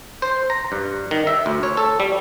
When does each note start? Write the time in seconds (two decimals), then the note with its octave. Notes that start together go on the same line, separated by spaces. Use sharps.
0.22 C5
0.50 A#5
0.72 G2
1.11 D#3
1.27 E5
1.46 D2
1.63 C#5
1.77 A4
2.00 G3